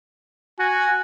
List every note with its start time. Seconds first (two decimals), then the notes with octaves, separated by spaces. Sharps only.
0.59 F#4 G#5